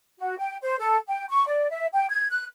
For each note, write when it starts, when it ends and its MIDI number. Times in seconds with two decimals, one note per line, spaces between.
0.19 0.38 66
0.38 0.56 79
0.62 0.76 72
0.79 0.97 69
1.07 1.25 79
1.29 1.45 85
1.47 1.70 74
1.70 1.87 76
1.93 2.08 79
2.09 2.28 92
2.29 2.44 90